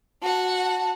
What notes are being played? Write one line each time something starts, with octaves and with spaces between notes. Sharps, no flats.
F#4 F#5 A5